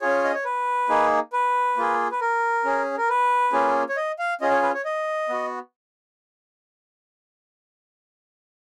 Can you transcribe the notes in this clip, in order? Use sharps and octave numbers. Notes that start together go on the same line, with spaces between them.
C#4 F4 G#4 C#5
D#5
C#5
B4
A#3 D#4 G#4
B4
A#3 F4 G#4
B4
A#4
C#4 G#4
A#4
B4
A#3 C#4 F4 G#4
C#5
D#5
F5
C#4 F4 G#4 D#5
C#5
B4
C#5
D#5
B3 F#4